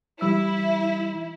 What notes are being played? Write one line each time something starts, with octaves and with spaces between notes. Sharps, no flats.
E3 G3 E4 E6